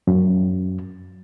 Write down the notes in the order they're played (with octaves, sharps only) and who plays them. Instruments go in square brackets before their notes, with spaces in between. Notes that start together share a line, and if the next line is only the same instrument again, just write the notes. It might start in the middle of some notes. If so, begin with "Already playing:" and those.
[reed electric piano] F#2